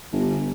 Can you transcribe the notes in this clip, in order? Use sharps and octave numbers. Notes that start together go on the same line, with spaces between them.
G1